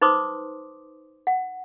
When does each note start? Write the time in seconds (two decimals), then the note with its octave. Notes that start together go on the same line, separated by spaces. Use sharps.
0.01 D#4 B4 C5 C6 D6 D#6
1.27 F#5